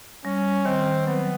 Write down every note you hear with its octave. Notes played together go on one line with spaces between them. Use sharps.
G3 C#4
D#3 C4
F#3 B3